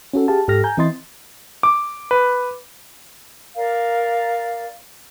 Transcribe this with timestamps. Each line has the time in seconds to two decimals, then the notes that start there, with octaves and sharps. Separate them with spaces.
0.14 C#4 F#4 A4
0.28 G4 G#4 F5 A5
0.48 G#2 G4 A4 F6 A#6
0.64 G#5 A#5 G6
0.77 E3 C4 E4 D#5 C6 A6
1.63 D6
2.11 B4
3.56 A#4 D5 F5